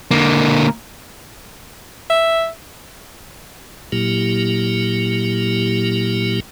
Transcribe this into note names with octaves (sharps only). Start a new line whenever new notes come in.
D3 A#3
E5
A#2 F#3 A#3 E4 G4